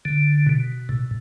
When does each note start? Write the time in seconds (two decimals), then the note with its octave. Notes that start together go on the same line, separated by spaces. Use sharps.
0.05 D3
0.46 B2
0.89 A2